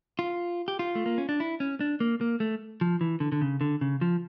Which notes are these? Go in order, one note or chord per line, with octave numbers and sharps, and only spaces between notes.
F4
G4
F4
A3
A#3
C#4
D4
E4
C#4
D4
A#3
A#3
A3
F3
E3
D3
D3
C#3
D3
C#3
F3